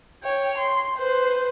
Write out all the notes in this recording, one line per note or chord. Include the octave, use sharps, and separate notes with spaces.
C#5 G5
C6
B4 C5